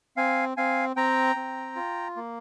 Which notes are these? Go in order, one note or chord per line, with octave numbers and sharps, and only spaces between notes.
C4 F5 G#5
C4 F5 G#5
C4 G5 A#5
C4
F4
A#3